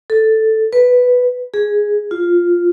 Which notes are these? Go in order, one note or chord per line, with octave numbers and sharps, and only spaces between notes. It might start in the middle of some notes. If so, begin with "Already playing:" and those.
A4
B4
G#4
F4